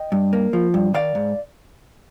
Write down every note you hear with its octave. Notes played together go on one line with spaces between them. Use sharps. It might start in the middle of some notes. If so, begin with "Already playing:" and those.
Already playing: D#5 G5
G2
A#3
F3
G2
D#3 D5 F5
G#2